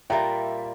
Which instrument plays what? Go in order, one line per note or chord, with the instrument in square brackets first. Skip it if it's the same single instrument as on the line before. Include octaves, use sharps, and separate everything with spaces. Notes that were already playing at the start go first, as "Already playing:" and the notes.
[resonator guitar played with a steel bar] A#2 G3 A#3 [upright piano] E5 G5